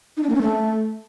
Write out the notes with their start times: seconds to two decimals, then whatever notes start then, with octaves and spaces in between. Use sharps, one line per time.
0.17 D#4
0.23 D4
0.29 A#3
0.35 C#4
0.41 A3